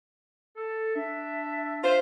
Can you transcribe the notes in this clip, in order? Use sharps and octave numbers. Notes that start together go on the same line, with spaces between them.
A4
D4 E5
F4 C5